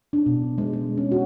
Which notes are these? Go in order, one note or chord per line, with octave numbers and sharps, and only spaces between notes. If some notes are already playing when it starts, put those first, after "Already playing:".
D4
B2
G#3
G#3
C#4
F#4